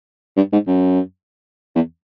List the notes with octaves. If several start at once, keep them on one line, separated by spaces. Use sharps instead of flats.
G2
G#2
F#2
E2